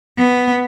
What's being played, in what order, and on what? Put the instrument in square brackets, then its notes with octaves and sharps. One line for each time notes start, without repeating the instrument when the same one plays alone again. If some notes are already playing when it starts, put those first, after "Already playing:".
[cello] B3